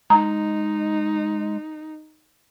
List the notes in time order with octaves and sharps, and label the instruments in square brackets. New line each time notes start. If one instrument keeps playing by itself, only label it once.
[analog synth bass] G#3 [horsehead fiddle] D#4 [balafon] A#5